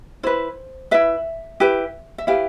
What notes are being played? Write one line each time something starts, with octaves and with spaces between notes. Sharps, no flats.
E4 B4 C5
E4 B4 E5
E4 G4 B4
E5
E4 G4 B4 F5